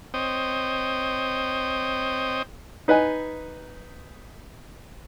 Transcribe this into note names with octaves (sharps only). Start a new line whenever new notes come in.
C4 C5 C#5 D#5 G5 D#6
D#4 B4 D#5 G#5